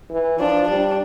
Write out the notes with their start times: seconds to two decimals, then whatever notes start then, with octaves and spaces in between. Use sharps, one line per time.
0.11 E3
0.39 F3 D4
0.68 G3 D4